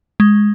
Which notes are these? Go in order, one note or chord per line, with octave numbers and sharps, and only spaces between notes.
G#3